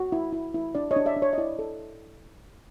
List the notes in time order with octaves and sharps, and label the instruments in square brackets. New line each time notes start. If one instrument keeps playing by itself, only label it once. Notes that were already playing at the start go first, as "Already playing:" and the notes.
Already playing: [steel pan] F#4
E4
E4
E4
D4 D5
C#5 D#5
D4
D5 E5
D4
C#5
D#5
E4 D5
A4